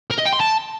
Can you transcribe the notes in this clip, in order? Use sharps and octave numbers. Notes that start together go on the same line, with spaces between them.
A#4
D#5
G5
C6
A5